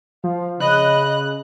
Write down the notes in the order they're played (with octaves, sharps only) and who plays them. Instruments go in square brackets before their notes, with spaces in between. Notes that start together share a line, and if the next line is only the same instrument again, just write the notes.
[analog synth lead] F3 [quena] F5
[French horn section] C#3 [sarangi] D#5 [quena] B5 [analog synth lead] F#6